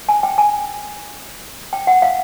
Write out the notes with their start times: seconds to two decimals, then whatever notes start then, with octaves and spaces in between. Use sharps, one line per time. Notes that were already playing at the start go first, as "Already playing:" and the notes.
0.09 G#5
0.23 G5
0.38 G#5
1.73 G5
1.87 F#5
2.02 F5